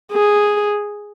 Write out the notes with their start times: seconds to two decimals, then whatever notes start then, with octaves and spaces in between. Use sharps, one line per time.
0.12 G#4